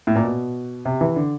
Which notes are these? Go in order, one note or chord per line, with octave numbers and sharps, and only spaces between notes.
A2
A#2
B2
C3
E3
D3